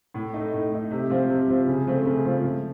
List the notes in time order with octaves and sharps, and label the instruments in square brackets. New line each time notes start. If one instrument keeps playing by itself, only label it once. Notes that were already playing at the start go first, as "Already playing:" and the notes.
[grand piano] A2
A3 D#4
A2
A3 D#4
C3
F3 C4 F4
C3
F3 C4 F4
C#3
F3 A3 C4 F4
C#3
F3 A3 C4 F4
F3